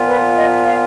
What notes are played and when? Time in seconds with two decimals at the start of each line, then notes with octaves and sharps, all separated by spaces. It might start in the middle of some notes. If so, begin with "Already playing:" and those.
Already playing: A#2 F3 B3 F4
0.08 B4
0.36 D#5
0.66 F5